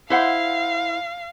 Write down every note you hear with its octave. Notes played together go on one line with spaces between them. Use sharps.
E4 C5 F5 F#5